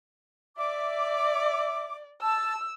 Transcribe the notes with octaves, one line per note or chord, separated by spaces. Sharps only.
D5 E5 D6
A5 E6